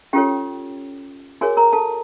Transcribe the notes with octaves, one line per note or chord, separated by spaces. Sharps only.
C#4 F4 G4 A4 C#5 G5
F#4 G#4 A#4 C#5 G#5
A#4 A#5
A4 A5